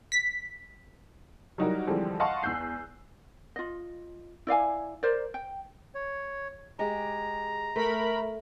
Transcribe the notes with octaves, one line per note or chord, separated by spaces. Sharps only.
B6
F#3 G3 D#4 E4 F#4 A#4
D3 E3 F3 G3 G#3 C4
D#5 F5 F#5 A5 C6 C#6
E2 E6 F#6 G6 C7
F4 D#5
E4 D5 F5 G#5
A#4 C5 D5
G5
C#5
G#3 G4 A#5
A3 A#4 B5